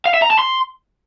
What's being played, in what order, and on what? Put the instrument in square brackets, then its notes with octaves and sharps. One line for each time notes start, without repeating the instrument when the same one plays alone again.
[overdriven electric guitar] F5
E5
A#5
A5
C6